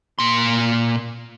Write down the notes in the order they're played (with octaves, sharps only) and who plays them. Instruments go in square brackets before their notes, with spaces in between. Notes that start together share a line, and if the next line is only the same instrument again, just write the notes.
[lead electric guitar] A#2 C6